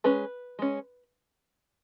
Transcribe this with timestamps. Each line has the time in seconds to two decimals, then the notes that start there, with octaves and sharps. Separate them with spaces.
0.04 G#3 C#4 B4
0.59 G#3 C#4